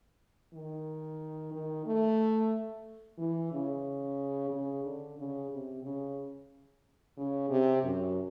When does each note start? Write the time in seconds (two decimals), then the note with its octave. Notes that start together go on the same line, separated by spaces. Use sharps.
0.54 D#3
1.53 D#3
1.86 A3
3.18 E3
3.52 C#3
4.51 C#3
4.84 D3
5.18 C#3
5.51 C3
5.83 C#3
7.17 C#3
7.49 C3
7.83 F#2